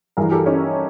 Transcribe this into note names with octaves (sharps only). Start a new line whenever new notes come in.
G2 E3 G#4 A#4
G4 A4
C#4 D#4